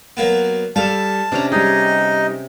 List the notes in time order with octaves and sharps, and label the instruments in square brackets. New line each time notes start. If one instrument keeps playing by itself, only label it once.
[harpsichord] F#3 A#3 B3
[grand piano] G3 A4 E7 [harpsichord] F5 [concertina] A5
[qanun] C3 C#4 A#5 [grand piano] D4
[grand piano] G3 G4 [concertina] D#4 D#5 [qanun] G#4